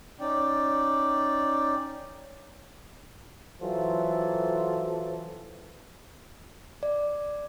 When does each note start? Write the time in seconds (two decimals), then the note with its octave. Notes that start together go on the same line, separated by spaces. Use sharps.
0.20 C#4 D#4 D5 G5
3.61 E3 F#3 F4 A4 C5
6.83 D5